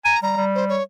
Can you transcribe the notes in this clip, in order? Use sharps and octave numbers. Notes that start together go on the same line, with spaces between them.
G#5 A#5
G3 A#5
G3
C5
C#5